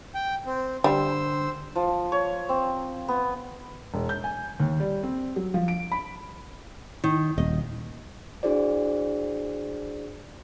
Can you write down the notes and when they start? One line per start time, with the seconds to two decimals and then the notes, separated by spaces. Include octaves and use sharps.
0.15 G5
0.46 C4
0.84 D3 G3 C5 E6
1.76 F3
2.12 C#5
2.49 C4
3.08 B3
3.94 E1
4.09 G6
4.24 G#5
4.60 D#2
4.80 G3
5.03 C4
5.36 F#3
5.54 F3
5.68 D7
5.92 B5
7.04 D#3
7.38 D#1 D#5
8.43 D4 E4 F#4 G#4 C5 D5